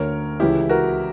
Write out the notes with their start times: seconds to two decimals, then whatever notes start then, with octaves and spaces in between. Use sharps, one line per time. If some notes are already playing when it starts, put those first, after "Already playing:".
Already playing: D2 D3 A#4 C#5
0.40 C#2 C#3 E3 E4 G4
0.69 F#4 A#4